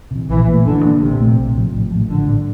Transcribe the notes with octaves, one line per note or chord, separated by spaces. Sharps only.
C3 E3
A#1 E3
A#2 A3
G2 D3
E3 A#3 D4
A#1 C3
A#2 A3 C4
A#1
A2 F3
A1
A2 F3
A1 D3
A2 G3 D4